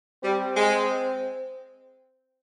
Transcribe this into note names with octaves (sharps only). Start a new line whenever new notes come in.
G3 C4
G#3